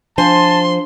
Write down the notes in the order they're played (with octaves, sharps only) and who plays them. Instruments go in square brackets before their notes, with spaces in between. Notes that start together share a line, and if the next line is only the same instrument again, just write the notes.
[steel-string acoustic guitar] F3 C5 G#5 [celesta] D4 [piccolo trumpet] A5 [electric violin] C6